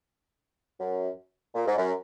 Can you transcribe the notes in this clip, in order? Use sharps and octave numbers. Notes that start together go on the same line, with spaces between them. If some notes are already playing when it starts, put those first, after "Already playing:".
F#2
A#2
G#2
F#2